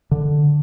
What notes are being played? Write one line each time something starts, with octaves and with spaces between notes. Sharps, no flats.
D3